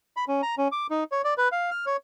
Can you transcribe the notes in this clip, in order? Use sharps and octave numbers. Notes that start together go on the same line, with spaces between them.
B5
C#4
A#5
C#4
D6
D#4
C#5
D5
B4
F5
F6
C#5